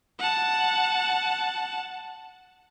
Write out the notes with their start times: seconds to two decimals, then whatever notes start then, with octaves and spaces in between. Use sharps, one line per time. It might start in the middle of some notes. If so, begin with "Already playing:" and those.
0.19 F#5 A5